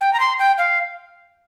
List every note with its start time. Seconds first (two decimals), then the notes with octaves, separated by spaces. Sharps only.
0.01 G5
0.13 A#5
0.20 C6
0.39 G5
0.58 F5